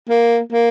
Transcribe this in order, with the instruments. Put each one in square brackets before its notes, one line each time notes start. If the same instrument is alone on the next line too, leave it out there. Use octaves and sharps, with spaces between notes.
[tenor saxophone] A#3
A#3